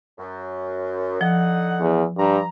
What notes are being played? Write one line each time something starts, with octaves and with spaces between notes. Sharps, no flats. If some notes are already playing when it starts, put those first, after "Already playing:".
F#2
D3 F3 D#4 F#5
E2
G2 A#5